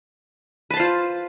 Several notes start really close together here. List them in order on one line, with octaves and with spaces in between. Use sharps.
B4 A5 C5 F4